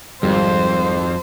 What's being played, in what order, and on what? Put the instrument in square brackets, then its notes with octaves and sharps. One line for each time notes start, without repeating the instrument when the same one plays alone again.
[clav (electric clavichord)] G#1 [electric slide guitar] F2 [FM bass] G3 [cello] C5